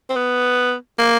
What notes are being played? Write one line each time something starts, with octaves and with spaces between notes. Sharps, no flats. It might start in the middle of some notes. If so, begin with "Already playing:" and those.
C4
B3
A#3